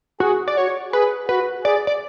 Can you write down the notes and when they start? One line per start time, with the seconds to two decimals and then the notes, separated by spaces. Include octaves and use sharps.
0.20 F#4 G#4
0.48 D5
0.57 F#4 C#5
0.93 G#4 B4
1.29 F#4 B4
1.64 G#4 D5
1.87 D5